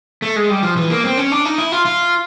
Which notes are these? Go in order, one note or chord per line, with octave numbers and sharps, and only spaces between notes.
A3
G#3
G3
F3
E3
A#3
C4
C#4
D4
D#4
E4
F4
F4